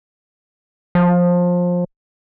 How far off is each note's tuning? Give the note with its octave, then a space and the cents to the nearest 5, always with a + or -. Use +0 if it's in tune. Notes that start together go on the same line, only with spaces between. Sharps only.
F3 +20